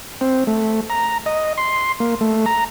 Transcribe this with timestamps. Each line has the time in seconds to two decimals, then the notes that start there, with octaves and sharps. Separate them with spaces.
0.21 C4
0.47 A3
0.90 A#5
1.26 D#5
1.58 C6
2.00 A#3
2.21 A3
2.46 A#5